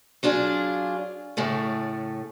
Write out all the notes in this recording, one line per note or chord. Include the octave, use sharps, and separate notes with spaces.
F#3 D4 F4 G#4
A2 C#3 A3